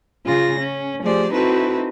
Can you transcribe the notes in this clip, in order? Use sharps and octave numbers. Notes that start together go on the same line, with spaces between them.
C#3 F4 G#4 A#6
C#4
F3 A3 G4 G#4 C5 D5
C4 D#4 E4 F#4 A4 B4